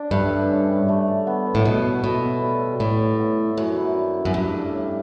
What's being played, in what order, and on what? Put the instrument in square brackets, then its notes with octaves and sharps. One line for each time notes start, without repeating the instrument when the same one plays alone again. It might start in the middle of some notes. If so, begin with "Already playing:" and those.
Already playing: [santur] D4
[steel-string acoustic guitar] G2 [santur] A3
[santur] B4
C#4
D5
A3
A3
B3
B4
[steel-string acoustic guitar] A2
[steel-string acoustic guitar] B2 [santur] A3
[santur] C#5
[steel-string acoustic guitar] B2 [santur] A3
[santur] A4
G3
G3
[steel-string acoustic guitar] A2 [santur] A3
[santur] C#5
B3
E5
[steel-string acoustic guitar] F#2 [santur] E4
[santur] E4
D4
D4
[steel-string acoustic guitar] F#2
[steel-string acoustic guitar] G2 [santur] A3
[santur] A3
C#4